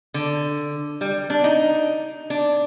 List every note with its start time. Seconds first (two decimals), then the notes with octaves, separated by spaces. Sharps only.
0.14 D3
1.01 G3
1.30 D4
1.44 D#4
2.30 D4